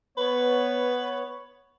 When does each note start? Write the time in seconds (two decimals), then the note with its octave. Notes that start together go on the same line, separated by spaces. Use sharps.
0.18 B3 B4 C#5